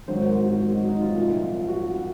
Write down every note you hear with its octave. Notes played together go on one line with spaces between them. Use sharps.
G#1 G#2 F#3 C5
A#4
F#4
F#4
D#4
D#4
F4
C2 A#2 F3
F#4